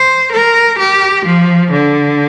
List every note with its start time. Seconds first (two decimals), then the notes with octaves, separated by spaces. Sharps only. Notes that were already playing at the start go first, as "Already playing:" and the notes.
Already playing: C5
0.32 A#4
0.79 G4
1.25 F3
1.71 D3